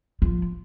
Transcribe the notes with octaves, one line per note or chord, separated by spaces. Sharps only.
F3